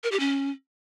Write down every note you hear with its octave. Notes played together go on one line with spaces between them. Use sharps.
A#4
G4
C#4